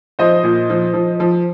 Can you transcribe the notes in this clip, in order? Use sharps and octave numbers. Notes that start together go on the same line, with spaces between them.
F3 C5 D#5
A#2
F3
F3
F3